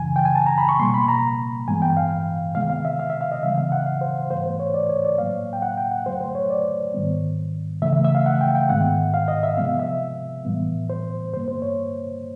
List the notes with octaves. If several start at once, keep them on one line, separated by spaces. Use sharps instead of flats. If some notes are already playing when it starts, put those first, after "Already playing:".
Already playing: F#2 C#3 E3 G#5
G5
G#5
A5
A#5
B5
C#6
B2 G3 A#3 C6
B5
A#5
G2 E3 G#3 B3 G#5
G5
F5
C3 D#3 G#3 B3 F5
F5
E5
F5
E5
F5
D#5
C#3 E3 G3 B3 E5
F5
F#5
F5
C5
G#2 E3 A3 C5
C5
C#5
D5
C#5
D5
A2 F#3 A#3 F5
G5
F#5
G5
F#5
F#2 D3 F#3 A3 C5
C5
C#5
D5
G#2 D#3 G3 B3
C#3 E3 A3 E5
E5
E5
F5
F#5
G5
G5
G#2 D#3 G#3 B3 F#5
F5
D#5
E5
C3 F3 G#3 B3 F5
E5
A2 E3 G3 B3
C5
G2 D3 G3 A#3 C5
C5
C#5